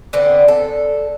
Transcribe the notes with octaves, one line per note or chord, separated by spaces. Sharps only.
D3 B3 C4
A4